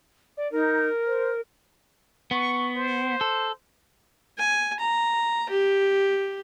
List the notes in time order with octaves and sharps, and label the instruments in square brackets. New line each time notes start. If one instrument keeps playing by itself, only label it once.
[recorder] D5
[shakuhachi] D#4 [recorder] A#4
[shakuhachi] C5
[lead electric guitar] B3 [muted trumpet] C#6
[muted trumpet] C5
[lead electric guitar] A4
[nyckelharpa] G#5
A#5
G4